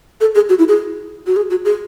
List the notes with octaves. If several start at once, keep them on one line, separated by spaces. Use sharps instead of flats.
A4
G#4
F#4
E4
G#4
F#4
G#4
F#4
G#4